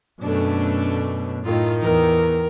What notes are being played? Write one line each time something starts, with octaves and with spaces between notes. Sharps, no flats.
F#2 B2 A3 C#4 D4
A2 D#3 D#4 F4
E2 A#4